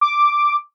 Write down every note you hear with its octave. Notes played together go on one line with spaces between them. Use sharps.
D6